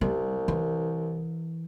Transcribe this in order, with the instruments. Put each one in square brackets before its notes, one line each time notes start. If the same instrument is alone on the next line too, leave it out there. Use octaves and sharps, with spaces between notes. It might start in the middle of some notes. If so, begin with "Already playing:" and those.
[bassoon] C2 [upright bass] G3
[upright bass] E3